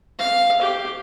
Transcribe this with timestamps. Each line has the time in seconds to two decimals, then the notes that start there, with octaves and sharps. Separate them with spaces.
0.19 F5
0.61 G4